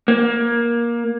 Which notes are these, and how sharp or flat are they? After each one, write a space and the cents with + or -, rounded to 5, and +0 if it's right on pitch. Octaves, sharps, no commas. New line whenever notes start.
A#3 +15